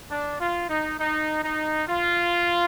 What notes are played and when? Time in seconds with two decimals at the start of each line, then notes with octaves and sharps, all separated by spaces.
0.11 D4
0.40 F4
0.70 D#4
0.99 D#4
1.43 D#4
1.88 F4